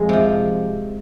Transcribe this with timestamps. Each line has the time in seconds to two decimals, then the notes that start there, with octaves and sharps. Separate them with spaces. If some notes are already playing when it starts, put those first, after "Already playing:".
Already playing: F2 G#3
0.09 C3 F3